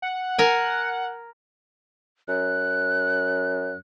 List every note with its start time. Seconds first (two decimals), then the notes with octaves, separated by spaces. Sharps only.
0.02 F#5
0.39 A#4 G#5
2.28 F#2 F#6